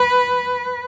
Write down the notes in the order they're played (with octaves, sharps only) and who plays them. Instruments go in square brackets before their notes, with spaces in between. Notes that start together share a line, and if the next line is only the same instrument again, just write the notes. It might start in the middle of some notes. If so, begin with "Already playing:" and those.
Already playing: [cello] B4